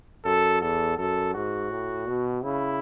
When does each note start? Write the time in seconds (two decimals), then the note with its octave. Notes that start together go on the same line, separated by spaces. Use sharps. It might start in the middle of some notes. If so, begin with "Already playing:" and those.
0.25 F#2 A4
0.61 E2 A4
0.98 F#2 A4
1.34 G#2 F#4
1.70 A2
2.07 B2
2.44 C#3 E4